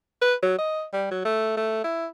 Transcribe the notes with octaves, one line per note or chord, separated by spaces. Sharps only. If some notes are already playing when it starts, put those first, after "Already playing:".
B4
F#3
D#5
G3
F#3
A3
A3
E4